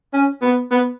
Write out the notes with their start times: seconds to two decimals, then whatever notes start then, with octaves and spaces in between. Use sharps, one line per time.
0.14 C#4
0.42 B3
0.71 B3